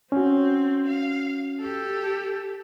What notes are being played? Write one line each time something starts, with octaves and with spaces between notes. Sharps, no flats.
C4 C#4 F#4
F5
G4 A4